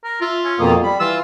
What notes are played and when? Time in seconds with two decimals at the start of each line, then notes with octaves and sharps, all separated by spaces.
0.04 A#4
0.21 F4 E5
0.45 C#4
0.59 F2 B2 A#3 D#6
0.83 G3 B5
1.00 E3 F4 E6